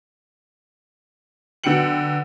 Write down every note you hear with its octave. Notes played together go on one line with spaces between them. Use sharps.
D3 F#3 B3 G5 C#7 F#7